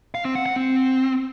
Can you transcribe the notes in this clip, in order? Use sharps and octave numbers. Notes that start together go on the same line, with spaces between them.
F5
C4
F#5
F#5
C4